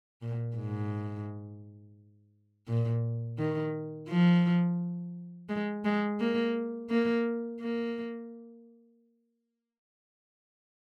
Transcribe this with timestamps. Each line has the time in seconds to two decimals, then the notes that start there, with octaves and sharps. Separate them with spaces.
0.22 A#2
0.57 G#2
2.68 A#2
3.38 D#3
4.09 F3
5.49 G#3
5.85 G#3
6.20 A#3
6.90 A#3
7.60 A#3